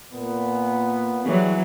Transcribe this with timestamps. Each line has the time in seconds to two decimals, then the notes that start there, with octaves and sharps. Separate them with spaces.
0.12 A#2 B3
1.25 E3 F#3 G3 G#4 C#5